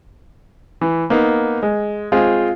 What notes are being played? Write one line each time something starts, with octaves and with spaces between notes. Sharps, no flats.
E3
A#3 B3 D#4
G#3
G#3 C4 F4 G#4